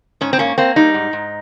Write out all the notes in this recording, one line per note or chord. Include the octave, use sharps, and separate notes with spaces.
G#2 C#4
C4
A#3 C#4
A#3 C4
G3 D#4
G#2
G#2